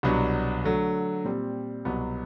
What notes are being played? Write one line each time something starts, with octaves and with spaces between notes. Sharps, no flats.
C2 B2 F#3 B3 D4
D3 F#3 A3
A#2 G3 C4
C2 B2 F#3 B3